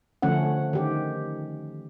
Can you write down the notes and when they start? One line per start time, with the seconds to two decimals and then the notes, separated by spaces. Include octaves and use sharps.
0.22 D3 F3 A3 C#4 F#5
0.73 D#3 G4